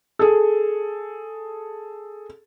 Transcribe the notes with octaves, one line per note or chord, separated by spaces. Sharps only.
G#4 A4